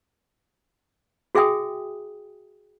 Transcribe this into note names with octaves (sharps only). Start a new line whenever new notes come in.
F#4 G#4 E5 G5 G#5 D#6